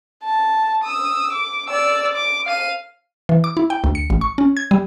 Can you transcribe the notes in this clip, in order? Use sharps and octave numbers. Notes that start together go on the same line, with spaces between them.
A5
D#6 E6
D6
D5 E6
D6
F5 D#7
E3
D6
E4
G5
D2
C#7
A1
C#6
C#4
G#6
G3